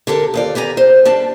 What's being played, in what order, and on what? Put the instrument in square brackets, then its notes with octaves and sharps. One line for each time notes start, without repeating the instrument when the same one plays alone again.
[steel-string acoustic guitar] D3 G4 A4 A#4
D#2 F4 D5
B3 G4 G#5 A#5
C5
G3 D4 A5